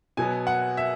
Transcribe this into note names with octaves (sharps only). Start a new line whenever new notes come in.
B2 F#3 B3 G#5
F#5
E5